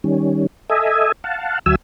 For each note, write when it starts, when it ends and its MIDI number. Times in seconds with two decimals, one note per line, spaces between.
0.04 0.47 51
0.04 0.47 55
0.04 0.47 61
0.70 1.12 69
0.70 1.12 75
0.70 1.12 76
0.70 1.12 80
1.24 1.59 77
1.24 1.59 78
1.24 1.59 81
1.66 1.75 38
1.66 1.75 54
1.66 1.75 66
1.66 1.75 76
1.66 1.75 80
1.66 1.75 88